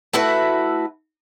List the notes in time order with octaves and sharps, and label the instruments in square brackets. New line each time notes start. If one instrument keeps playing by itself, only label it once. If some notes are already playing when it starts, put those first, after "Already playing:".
[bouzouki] A3 E4 F#4 B4